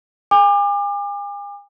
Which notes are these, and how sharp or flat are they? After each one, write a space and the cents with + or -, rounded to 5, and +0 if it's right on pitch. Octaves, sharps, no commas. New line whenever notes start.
G#5 -40 D6 +30